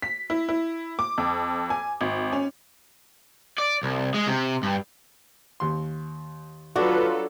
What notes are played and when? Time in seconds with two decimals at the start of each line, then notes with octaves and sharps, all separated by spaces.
0.02 B6
0.30 E4
0.49 E4
0.99 D6
1.18 F2
1.70 G#5
2.01 G#1
2.33 C#4
3.58 D5
3.83 C2
4.14 G#3
4.27 C3
4.63 G2
5.60 D#2 C6
6.76 F#3 D4 F4 F#4 A4 B4